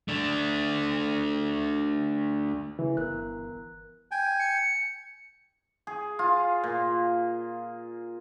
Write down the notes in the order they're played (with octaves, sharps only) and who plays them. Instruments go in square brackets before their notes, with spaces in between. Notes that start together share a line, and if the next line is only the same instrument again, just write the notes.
[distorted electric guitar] A3 D4
[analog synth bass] C#3 [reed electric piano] E3
[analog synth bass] G1 [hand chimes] B3 A#4 F#6
[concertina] G5 G#5
[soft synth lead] C#7
[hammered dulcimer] G#4
F4
A#2